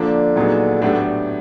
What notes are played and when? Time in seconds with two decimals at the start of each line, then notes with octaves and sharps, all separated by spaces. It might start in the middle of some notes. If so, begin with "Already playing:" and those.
Already playing: D3 F3 A#3 D4
0.36 A#2 F#3 B3 D#4 G#4
0.82 A2 D3 F#3 B3 D4 G4